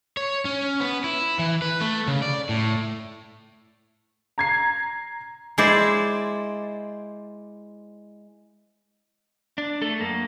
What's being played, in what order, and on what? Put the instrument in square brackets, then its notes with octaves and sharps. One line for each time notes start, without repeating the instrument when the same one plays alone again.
[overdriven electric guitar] C#5
C#4
B3
E4
E3
B4
A3
C#3
D5
A2
[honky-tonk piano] A#5 G#6 C7
[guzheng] G#3 E4 C5 D5
[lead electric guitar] D4
A3 A4
F#2 A#3